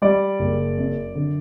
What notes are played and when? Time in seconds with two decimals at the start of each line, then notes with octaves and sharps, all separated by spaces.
0.02 G3 D5
0.39 F#1
0.78 F#2
1.15 D3